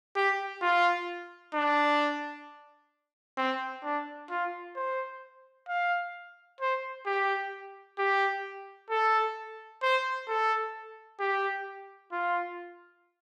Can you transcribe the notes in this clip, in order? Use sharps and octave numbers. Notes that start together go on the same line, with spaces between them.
G4
F4
D4
C4
D4
F4
C5
F5
C5
G4
G4
A4
C5
A4
G4
F4